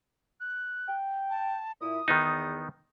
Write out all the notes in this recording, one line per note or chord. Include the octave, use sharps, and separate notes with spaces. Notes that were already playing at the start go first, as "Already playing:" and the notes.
F#6
G5
A5
A#2 E4 D#6
E2 D#3 B3 D#4